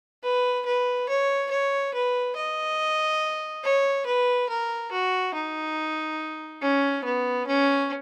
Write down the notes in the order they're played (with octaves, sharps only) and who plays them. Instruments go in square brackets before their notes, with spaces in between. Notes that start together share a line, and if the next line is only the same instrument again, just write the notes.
[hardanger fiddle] B4
B4
C#5
C#5
B4
D#5
C#5
B4
A#4
F#4
D#4
C#4
B3
C#4